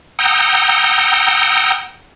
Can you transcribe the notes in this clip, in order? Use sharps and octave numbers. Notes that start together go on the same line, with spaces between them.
F#5 G5 A#5 D#6 E6 G6